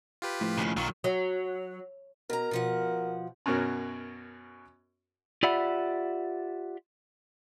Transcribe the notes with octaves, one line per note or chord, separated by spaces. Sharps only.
F4 G4 B4
A2 F3
D#2 C#3
B1 D#3 F#3 F4
F#3
B2 A#4 A#5
B2 F3 F#5
F#2 B2 C#4 F#4 A#4
F4 G4 D5 E5 F#5 B5